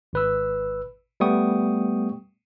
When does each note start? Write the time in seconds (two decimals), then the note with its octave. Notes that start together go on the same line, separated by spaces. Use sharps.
0.13 G#1 B4 E6
1.20 G3 A3 B3 G5 C#6 D#6